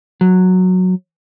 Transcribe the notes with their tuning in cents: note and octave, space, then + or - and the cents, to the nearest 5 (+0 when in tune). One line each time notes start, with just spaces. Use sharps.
F#3 -10